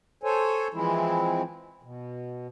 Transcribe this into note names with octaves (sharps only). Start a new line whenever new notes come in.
A4 C5 C#5 G#5
E3 F3 G#3 C4 E4
B2